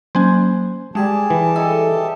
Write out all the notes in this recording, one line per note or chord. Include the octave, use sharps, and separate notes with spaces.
F#3 A#3 C#4 C5 G#5
G3 G#3 G4 G#4 A5 G#6
E3
A4 D#5 E5 G5